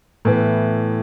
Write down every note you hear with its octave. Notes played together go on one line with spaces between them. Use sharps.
A2 E3 B3